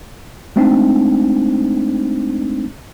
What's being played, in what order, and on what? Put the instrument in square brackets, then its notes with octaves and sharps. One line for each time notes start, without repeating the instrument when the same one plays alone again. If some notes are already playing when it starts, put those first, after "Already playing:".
[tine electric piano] G#3 A3 C4 D4 D#4